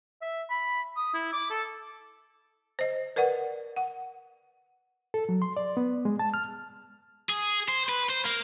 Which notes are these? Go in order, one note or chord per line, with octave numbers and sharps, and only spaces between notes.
E5
B5
D#6
E4
D6
A4
C5 D#5
A#4 B4 D5 F#5
F#5
A4
F#3
C6
D5
B3
G#3
A5
F6
G#4
C5
B4
C5
A#3